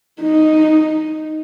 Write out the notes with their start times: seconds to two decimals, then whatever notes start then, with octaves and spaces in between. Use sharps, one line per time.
0.22 D#4